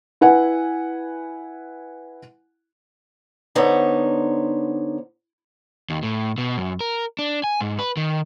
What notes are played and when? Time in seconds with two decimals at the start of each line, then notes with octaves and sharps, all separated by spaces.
0.21 E4 B4 F#5 G#5
3.55 D3 B3 D#4 C5 C#5
5.90 D#2
6.03 A2
6.38 B2
6.57 F#2
6.80 A#4
7.19 D4
7.44 G#5
7.61 G#2
7.79 B4
7.97 D#3